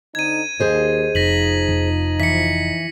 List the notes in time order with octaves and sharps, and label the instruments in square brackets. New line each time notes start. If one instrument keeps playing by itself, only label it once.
[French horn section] D3 C4 D#4 [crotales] G#6 D#7
[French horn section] D#2 [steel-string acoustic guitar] G#4 C5 D#5
[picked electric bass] F1 [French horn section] F3 D#4 [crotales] A#6 B6 F#7
[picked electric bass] F1
[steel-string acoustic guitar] E3 [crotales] B6 C#7